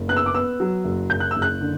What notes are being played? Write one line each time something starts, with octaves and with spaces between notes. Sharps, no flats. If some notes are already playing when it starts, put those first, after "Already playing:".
Already playing: F#1
B3 F#6
E6
D6
B3 E6
F#3
F#1
F#1 G6
F#6
F#1 E6
F#6
D3